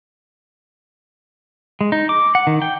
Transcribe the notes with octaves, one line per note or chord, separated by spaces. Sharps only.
G#3
D#4
D6
F#5
D#3
G5